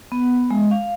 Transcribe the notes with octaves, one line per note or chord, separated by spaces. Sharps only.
B3
G#3
F5